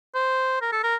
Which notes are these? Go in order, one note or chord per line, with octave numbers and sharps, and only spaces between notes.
C5
A#4
A4
A#4